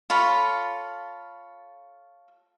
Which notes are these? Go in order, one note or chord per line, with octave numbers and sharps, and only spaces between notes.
F4 A4 C#5 B5